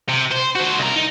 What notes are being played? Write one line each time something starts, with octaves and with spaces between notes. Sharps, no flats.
C3
C5
F#4 C5
C2 A#4
D#4